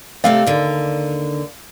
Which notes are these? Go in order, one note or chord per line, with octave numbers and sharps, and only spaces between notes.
C3 A3 C4 D5 F5
D#2 D3